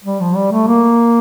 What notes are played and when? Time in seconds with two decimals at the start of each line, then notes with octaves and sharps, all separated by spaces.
0.05 G3
0.20 F3
0.35 G3
0.52 A3
0.67 A#3